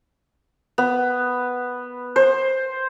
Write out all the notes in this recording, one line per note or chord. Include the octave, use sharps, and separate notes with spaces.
B3
C5